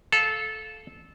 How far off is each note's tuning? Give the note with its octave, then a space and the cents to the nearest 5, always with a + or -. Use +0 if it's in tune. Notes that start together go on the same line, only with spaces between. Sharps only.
A4 -20 F5 +0